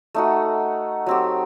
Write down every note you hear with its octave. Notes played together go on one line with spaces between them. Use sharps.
A3 D#4 F#4
F#3 C4 G4